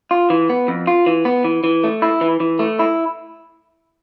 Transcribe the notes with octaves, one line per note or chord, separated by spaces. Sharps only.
F4
E3
B3
F2
F4
E3
B3
E3
E3
A3
E4
E3
E3
A3
E4